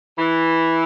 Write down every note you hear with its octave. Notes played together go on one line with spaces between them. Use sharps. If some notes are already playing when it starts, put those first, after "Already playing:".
E3